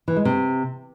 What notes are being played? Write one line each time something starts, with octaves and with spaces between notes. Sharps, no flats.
E3
G#3
C3